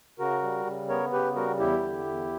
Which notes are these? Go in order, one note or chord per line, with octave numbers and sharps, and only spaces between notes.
C#3 F#4 A#4
G3
C#3
B3 A#4 C#5
C#3 G4 B4
G3 F#4 A#4
E2 E4 G4
D3
E2